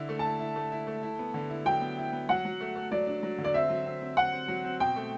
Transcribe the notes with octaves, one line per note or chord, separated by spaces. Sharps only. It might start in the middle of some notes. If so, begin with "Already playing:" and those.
Already playing: D3 E4
A3
E4 A5
E4
A3
E4
A3
E4
B3
D3
E4
F#3 G5
B3
E4
B3
F#3 F#5
F#3
A3
A3
F#3 D5
D4
F#3
D3
D5
C4 E5
F#3
C4
C4
C4 F#5
C4
F#3
C4
B2 G5
A3